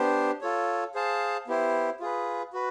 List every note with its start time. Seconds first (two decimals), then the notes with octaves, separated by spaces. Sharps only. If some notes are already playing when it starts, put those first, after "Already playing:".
Already playing: B3 D4 G4 C5
0.41 F4 A4 C#5
0.95 G#4 C5 F5 A5
1.48 B3 E4 G4 C5
2.00 F4 G#4 B4
2.53 F#4 B4